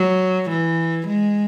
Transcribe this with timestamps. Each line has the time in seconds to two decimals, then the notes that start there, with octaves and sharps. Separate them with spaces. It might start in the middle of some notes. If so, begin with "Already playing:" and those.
Already playing: F#3
0.50 E3
1.07 G#3